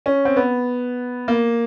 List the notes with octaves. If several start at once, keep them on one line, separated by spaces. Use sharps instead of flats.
C#4
C4
B3
A#3